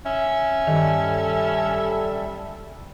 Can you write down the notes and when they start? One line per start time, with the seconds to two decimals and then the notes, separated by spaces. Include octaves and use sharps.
0.06 C#4 E5
0.67 G2 D#3 G3 A4